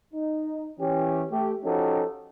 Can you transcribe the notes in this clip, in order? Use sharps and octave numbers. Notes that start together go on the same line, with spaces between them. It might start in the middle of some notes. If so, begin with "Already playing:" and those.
D#4
E3 C#4 G4
A3 G4
F3 C#4 D#4 F#4 G4 A4